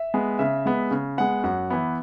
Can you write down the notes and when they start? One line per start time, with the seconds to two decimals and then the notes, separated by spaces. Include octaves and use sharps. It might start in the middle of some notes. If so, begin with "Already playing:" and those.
Already playing: E5
0.14 G#3 B3
0.39 C#3 E5
0.66 G#3 B3
0.91 C#3
1.18 G#3 B3 F#5
1.43 F#2 F#5
1.70 E3 B3